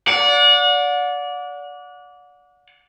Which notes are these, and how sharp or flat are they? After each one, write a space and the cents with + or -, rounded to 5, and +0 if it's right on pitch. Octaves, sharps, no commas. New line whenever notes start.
D5 -25 F#5 -35